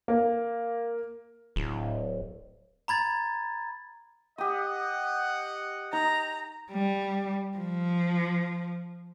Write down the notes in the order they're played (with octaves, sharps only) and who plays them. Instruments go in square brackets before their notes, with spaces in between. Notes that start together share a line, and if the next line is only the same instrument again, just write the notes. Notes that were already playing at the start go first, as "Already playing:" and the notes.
[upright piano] A#3
[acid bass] D1
[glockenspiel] A#5 B5 G#6 A6
[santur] G4 D#6 [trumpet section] D#5 F#5
[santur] D#4 [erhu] A#5
[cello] G3
F3